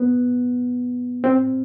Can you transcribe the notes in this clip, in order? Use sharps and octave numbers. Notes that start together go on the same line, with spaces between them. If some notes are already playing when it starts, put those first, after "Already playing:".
Already playing: B3
C4